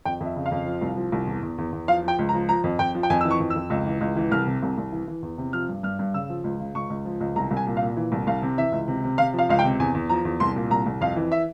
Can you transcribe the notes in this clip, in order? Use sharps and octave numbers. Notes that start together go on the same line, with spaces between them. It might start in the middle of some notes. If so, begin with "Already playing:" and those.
F2 G5
F2 E5
C#3
F5
F2
F3
C2
F3
C2
E2
E2
E2
E2
F3 F5
F3 G5
C#2
A#5
F3
F3 A#5
F2
F2 G5
F3
G5
F2 G#5
E3 E6
C#6
F2
E6
F2
C#2
E3
C#2
E3
C2 F6
C3
C2
C2
E3
E3
E2
C3
F3 F6
G2
G2 F6
G2
C#3 E6
F3
C#2
C#3
C#2 C#6
C#2
F3
C#2
C2 A#5
C2
G#5
A#2
F5
A#2
E3
C2
C2 F5
C3
E3 E5
C#2
C3
C3
C3 F5
F3
F5
C#2 F5
G5
C3
E2 G#5
E2
F3 A#5
E2
C2 C6
A#2
C2 A#5
C2
F2 F5
E3
E5